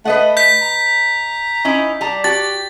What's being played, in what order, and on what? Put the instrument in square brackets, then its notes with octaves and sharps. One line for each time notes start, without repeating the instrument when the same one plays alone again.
[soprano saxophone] A3 [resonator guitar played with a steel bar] B4 D#5 F#5
[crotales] G6 B6
[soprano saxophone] A#5
[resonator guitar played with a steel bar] C#4 D#4 E4
G3 A5 A#5
[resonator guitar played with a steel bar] F#4 [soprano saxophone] G4 [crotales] A6